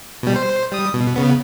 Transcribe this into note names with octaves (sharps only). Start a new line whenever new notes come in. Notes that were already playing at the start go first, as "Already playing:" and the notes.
B2 G3
C5
G3 D#6
B2
C#3 B3